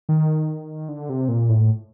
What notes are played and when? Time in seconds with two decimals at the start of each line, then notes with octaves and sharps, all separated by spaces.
0.09 D#3
0.89 D3
1.09 C3
1.29 A#2
1.49 A2